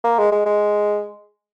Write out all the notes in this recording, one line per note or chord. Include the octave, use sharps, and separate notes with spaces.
A#3
G#3
G#3
G#3